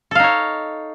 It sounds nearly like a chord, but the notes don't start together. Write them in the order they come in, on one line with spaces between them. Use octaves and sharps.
A4 F5 D#4 C#5